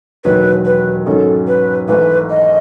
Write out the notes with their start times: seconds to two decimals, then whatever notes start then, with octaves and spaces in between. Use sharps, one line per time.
0.24 E1 D#2 D#3 F#3 B4
0.65 B4
1.06 G#2 D#3 F#3 C#4 A4
1.47 B4
1.88 G#1 G#2 E3 A3 B4
2.30 D#5